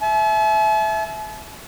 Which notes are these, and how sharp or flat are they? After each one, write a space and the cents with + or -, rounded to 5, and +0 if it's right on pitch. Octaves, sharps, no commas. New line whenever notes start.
E5 +0 A5 -45